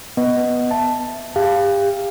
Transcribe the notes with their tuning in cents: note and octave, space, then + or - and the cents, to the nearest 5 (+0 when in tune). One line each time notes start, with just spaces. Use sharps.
B3 +0 B4 +0 D#5 +0
E5 +10 A5 +0
G4 +35 F5 +0